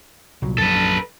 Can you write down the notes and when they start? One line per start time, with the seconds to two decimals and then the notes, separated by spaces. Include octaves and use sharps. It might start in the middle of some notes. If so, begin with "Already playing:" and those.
0.42 C2 A#2 F#3
0.58 A#1 F#2 A4 B4